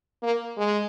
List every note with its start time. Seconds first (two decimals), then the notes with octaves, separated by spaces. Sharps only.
0.23 A#3
0.57 G#3